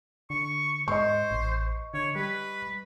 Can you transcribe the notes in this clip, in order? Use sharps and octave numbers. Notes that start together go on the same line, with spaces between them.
D3 C#6
G#2 C5 D#5 C#6
A1
D3 C#5
G3 B4